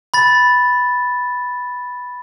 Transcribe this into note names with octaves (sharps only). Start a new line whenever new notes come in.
B5 A6